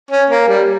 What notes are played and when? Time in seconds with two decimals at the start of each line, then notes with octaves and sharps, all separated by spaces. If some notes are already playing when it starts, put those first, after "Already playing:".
0.11 C#4
0.30 A#3
0.49 G3